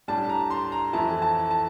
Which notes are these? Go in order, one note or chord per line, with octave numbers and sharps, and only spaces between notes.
A2 G3 D4 A5
A#5
C6
A#5
F2 E3 A3 E4 A5
A5
A5